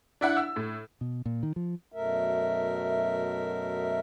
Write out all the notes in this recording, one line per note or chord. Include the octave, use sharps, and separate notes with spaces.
D4 E4 F#5
E6
A2
B2
A#2
D#3
F3
F#2 B2 A3 A#4 E5